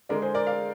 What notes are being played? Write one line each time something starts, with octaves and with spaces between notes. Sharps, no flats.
D3 G#3 A#4 D5
G#4 C5
A#4 D5
D5 F5